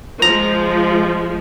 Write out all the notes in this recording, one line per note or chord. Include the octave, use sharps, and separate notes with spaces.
F3 G#3 A#5